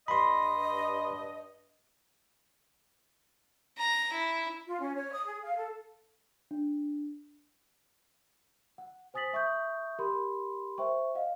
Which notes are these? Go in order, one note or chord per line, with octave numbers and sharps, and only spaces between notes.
G2 D#5 B5 C6
A#5
E4
F4
C#4
C#5
D#6
G#4
F5
A4
D4
F#5
C5 G#5 D#6 A6 B6 F#7
E5 C#6 D#6 G6
G4 A#4 B5 C6
C5 E5 G5 C#6
D#5 F5 F#5